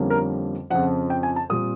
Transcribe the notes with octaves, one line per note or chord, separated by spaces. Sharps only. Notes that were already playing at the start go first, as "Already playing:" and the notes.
Already playing: F2 D3 G3 A#3 C#4
A#4
F2 C#3 F3 F#5
G5
G#5
A5
A#2 G3 C4 D#6